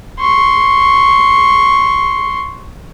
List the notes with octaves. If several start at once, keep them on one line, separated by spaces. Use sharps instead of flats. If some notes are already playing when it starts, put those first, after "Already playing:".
C6 C#6